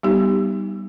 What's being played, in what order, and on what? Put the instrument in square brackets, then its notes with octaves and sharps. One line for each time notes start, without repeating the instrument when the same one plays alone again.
[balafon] G3 B3 D#4 G4